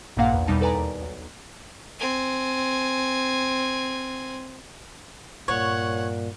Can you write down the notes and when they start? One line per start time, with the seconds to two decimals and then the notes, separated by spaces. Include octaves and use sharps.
0.17 A#1 G2 A#2 A#3 F5 F#5
0.33 E2
0.47 E2 B2 G3 D#4 A5
0.61 A4 B4 D5 G#5 A#5
0.74 D#2
1.01 B1
1.99 C4 G#5
5.48 G2 A#2 C#5 F#5